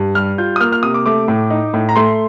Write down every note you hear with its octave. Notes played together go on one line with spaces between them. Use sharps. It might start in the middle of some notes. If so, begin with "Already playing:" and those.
Already playing: G2
G3 F6
F4 G6
D#6
A#3 F6
F6
C3 D#6
D6
A3 D6
A2
D#4
A2
A#5
A3 C6